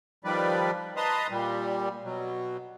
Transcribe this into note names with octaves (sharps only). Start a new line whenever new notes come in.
D#3 F3 G3 B4 D5
B4 D#5 A5 A#5 C6 D#6
A#2 G3
B2 F#3